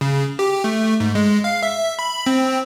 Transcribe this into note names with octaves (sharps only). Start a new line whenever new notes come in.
C#3
G4
A3
G#2
G#3
F5
E5
B5
C4